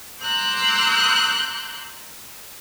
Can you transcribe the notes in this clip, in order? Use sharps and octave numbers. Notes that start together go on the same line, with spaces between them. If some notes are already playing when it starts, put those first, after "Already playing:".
A#5 C6 D6 E6 F#6 G6